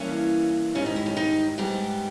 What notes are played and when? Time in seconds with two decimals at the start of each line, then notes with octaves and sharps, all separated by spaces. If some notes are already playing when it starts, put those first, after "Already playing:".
Already playing: G2 E3 A#3 C#4
0.75 G#2 D#3 G3 C#4
0.86 D#4
0.96 E4
1.06 C#4
1.17 D#4
1.58 G#2 G3 B3 G4